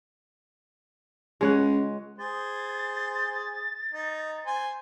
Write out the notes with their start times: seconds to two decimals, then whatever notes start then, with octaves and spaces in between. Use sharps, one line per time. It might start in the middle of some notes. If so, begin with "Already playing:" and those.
1.41 C#2 G#3 C#5 F#5
2.18 G#4 C5 A6
3.94 D#4
4.47 C5 G#5